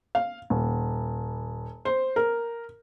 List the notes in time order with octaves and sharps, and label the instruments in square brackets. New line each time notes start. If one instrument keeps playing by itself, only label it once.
[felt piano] F5
D#1
C5
A#4